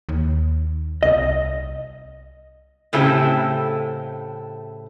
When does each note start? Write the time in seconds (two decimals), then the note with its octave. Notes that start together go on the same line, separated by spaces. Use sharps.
0.09 D#2
1.03 C2 D#5
2.93 A2 C#3 A3 C4 E4 G4